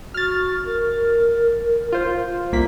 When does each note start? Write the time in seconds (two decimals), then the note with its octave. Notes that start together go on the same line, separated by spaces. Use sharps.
0.14 F#4 F6 A6
0.66 A#4
1.92 F4 C5
2.52 C2 A#3 F4 B6